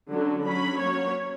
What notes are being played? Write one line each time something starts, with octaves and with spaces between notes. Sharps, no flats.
D3 F#3 C#4
F#3 C#4 B5
F#3 A#3 C#4 C#5